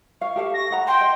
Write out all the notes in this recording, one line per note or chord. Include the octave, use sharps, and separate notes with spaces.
F5 C#6
G4 A4 F5
A#6
G#4 F#5 A#5
G5 C6
D#5